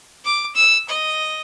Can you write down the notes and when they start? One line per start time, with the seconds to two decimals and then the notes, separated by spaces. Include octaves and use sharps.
0.25 D6
0.55 E6
0.89 D#5